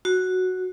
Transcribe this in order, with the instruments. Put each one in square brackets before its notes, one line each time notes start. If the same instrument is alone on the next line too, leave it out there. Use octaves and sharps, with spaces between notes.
[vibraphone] F#4